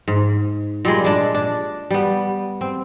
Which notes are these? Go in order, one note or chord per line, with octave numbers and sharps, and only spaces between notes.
G#2
A#2 G3 G#3
G#3 D4
D4
G3 B3
C4